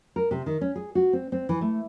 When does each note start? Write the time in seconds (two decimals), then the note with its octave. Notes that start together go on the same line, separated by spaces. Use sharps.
0.16 A#4
0.31 C3
0.46 D#3
0.61 C#4
0.76 G#4
0.95 F#4
1.13 C4
1.32 C4
1.49 E3
1.61 A3